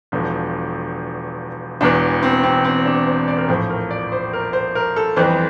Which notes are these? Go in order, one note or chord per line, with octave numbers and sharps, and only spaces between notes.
E1 E2 D3 F3
E1 E2 E3 D4
C4
C4
C4
D4
C5
D5
A#4
A#1 A2 F3 C5
A#4
D5
C5
A#4
C5
A#4
A4
G1 F2 E3 C5